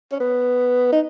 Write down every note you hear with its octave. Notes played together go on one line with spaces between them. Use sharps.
C#4
B3
D#4